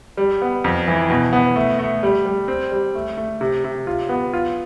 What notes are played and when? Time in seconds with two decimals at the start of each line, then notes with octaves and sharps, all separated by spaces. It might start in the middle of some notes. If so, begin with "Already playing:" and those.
0.17 G3
0.42 B3
0.64 F2
0.88 E3
1.10 B2
1.33 B3
1.56 A3
1.79 A3
2.03 G3
2.26 G3
2.48 C4
2.72 G3
2.95 A3
3.17 A3
3.41 C3
3.64 C3
3.87 F4
4.09 B3
4.33 F4